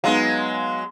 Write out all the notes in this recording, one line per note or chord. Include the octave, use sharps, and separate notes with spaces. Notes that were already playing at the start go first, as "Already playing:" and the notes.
F#3 G#3 B3 D#4 F5